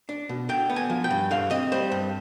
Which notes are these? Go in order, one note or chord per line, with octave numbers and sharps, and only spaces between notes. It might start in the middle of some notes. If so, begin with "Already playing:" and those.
D4
B2
D3 G5
B3
G#5
F3
G5
G2
D3 F5
C4 D#5
G3 C5
G2